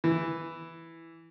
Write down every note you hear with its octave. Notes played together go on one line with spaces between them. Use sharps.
E3